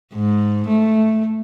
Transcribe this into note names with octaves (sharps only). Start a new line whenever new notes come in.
G#2
A3